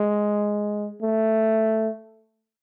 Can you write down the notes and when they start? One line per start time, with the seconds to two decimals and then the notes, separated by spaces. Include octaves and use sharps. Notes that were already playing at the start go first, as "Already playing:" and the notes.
Already playing: G#3
1.02 A3